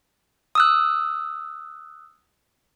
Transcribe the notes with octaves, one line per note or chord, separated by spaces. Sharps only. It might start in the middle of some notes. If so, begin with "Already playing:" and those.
D#6 E6 F#6